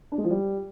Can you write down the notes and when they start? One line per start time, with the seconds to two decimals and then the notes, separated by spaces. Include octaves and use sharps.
0.12 D4
0.18 G#3
0.24 F3
0.30 G3